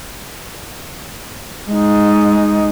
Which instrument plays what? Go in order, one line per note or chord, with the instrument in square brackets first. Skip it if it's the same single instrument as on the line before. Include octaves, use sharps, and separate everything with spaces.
[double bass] G#3 D#4